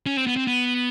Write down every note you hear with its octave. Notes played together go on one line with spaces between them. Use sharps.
C#4
C4
B3
C4
B3